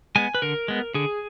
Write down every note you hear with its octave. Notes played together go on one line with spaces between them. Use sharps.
G#3 B3 G#5
B4
D3 A#4
G#3 B3
D3 G#4